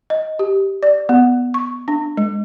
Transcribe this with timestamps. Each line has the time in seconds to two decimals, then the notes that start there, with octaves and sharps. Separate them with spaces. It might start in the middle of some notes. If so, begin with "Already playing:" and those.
0.10 D#5
0.39 G4
0.83 D5
1.09 B3
1.54 C#6
1.88 D4
2.17 G#3